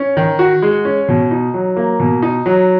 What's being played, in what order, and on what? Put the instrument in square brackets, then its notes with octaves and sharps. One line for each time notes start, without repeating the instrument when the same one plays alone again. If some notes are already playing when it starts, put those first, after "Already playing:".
Already playing: [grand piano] C#4
D#3
F#4
G#3
C#4
B2
D#4
F#3
A#3
B2
D#4
F#3